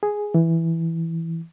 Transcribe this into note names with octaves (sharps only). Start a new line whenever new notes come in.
G#4
E3